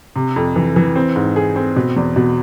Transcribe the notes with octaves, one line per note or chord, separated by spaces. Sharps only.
C3
F2
E3
E3
C4
G#2
G#4
C4
B2
E2
B2